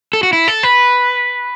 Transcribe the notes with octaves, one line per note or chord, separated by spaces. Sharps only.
A4
F#4
E4
A4
B4